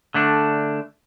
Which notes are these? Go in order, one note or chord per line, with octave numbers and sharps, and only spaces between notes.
D3 A3 D4